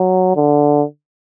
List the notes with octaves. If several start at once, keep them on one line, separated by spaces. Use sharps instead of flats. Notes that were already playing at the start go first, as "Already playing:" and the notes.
Already playing: F#3
D3